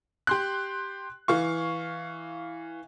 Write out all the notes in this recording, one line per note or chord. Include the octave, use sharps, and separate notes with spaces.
G4 C6 F#6
E3 F5 C#6